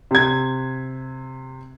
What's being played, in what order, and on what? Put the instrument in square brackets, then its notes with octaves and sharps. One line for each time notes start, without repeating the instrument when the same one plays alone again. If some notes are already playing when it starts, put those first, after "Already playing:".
[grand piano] C3 G#6